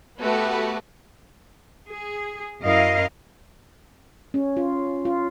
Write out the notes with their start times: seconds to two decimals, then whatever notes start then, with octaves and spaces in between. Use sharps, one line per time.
0.18 A3 B3 F#4 G4 B4
1.89 G#4
2.61 F#2 E4 A#4 D#5 F5
4.34 C#4
4.57 F4
5.05 F4